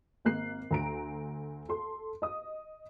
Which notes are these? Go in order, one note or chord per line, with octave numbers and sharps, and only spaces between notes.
G#1 A#3 F#6 C7
D2 A#5 D7
A4 C6
D#5 D#6